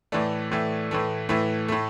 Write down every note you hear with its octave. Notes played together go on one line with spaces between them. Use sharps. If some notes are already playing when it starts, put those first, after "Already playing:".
A2 E3 A3 D5
A2 E3 A3
A2 E3 A3
A2 E3 A3
A2 A3